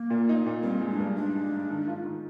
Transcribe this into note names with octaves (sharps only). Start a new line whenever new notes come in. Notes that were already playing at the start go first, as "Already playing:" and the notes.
Already playing: A#3
A#2
D#4
A#2
G2 C4
G#3
D4
G2
D4 D#4
G#3
G#2
D#3
F4
D#3